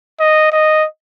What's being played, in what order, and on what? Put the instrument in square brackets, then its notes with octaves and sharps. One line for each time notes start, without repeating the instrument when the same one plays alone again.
[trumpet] D#5
D#5